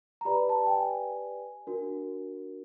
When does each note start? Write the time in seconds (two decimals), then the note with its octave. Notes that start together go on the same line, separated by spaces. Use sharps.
0.21 A#5
0.25 G4 B4 D5 B5
0.49 A5
0.67 G5
0.73 G#5
1.67 D4 F#4 A#4